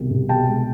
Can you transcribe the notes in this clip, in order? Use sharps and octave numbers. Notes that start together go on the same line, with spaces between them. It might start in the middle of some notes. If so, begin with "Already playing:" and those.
Already playing: C2 B2 D#3
C2
B2 G5 A5
G#3